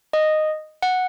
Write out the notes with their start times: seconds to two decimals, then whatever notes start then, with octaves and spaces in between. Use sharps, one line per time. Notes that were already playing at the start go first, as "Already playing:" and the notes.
0.13 D#5
0.83 F#5